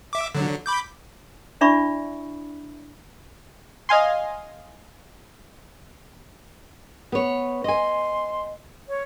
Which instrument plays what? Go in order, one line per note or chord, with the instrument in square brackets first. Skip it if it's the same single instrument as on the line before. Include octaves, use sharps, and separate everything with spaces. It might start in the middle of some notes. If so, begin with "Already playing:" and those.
[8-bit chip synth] E5 D6
D3 F#3
B5 D6 G6
[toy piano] D4 E4 D5 E5 B5 C#6
[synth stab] D#5 F5 G#5 C6
[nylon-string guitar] B3 C#5
[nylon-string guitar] D#5 G#5 [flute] C6
[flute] C#5